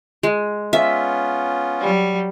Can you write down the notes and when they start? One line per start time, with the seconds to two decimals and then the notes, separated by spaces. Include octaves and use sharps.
0.23 G#3
0.73 B3 C#4 F4 E5
1.81 F#3 G3